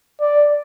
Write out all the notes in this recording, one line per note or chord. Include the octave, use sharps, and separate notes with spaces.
D5